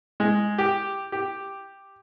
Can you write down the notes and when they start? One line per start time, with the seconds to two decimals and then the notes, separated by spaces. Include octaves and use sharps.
0.20 G#3
0.58 G4
1.12 G4